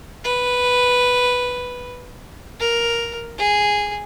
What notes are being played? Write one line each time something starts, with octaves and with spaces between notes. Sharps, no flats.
B4
A#4
G#4